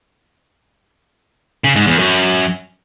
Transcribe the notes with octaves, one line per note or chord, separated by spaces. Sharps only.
C#3
G#2
E2
F#2